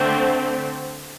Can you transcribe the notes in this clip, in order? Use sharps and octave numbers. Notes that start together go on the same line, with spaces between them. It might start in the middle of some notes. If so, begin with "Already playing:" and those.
Already playing: D3 A3 C4